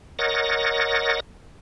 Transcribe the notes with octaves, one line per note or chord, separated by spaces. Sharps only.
A#4 C#5 D#5 F#5 A6 A#6